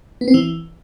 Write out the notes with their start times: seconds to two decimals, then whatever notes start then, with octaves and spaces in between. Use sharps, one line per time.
0.21 B3
0.28 C4
0.34 E3